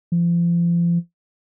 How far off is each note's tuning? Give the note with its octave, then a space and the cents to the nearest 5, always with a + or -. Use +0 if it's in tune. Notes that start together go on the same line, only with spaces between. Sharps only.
F3 -35